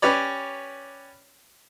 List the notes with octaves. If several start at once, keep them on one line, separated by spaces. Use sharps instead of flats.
C#4 G4 B4 C#5 D5